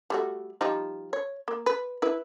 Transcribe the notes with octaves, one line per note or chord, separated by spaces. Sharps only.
G3 A3 F#4
F3 G3 D#4
C#5
A#3
B4
E4 B4